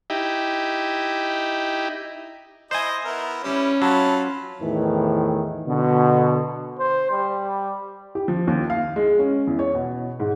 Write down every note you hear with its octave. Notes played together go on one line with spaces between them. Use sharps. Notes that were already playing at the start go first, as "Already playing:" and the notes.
D#4 E4 G4
D#4 E4 C5 D#5 G#5
B3 E4 A#4
G3 C#4 E4
F#3 F4 A5 B5
E2 A2 D#3 E3
B2 D3
C5
G3
G4
F3
D#2
F5
G#3
C#4
E2
C#5
B2
G#2